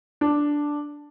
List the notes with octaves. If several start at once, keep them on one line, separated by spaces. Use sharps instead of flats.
D4